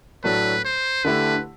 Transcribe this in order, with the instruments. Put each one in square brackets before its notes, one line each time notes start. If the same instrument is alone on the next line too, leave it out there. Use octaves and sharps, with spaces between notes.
[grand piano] A2 F#3 A3 D4 A4 [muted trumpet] B4
[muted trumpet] C5
[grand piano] D3 A3 E4 G4 [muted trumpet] B4